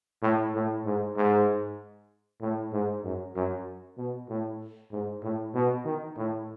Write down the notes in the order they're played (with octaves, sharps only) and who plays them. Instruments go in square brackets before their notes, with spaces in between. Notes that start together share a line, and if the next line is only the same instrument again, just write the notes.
[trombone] A2
A2
G#2
G#2
A2
G#2
F#2
F#2
B2
A2
G#2
A2
B2
D#3
A2